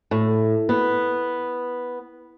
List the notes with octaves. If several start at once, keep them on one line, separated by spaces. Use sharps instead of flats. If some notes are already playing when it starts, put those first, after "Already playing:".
A2
B3